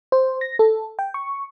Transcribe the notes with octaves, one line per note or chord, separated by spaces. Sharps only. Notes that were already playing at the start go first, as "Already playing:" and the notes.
C5
A#6
A4
G5
C#6